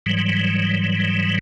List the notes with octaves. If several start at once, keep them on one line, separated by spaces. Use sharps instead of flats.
G#2 E3 F#3 G3